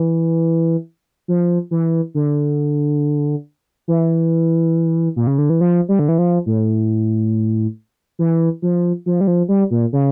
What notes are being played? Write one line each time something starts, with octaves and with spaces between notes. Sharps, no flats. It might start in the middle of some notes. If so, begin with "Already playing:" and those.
Already playing: E3
F3
E3
D3
E3
A#2
C#3
D3
E3
F3
G3
D3
E3
F3
A2
E3
F3
F3
G3
F3
G3
A#2
C#3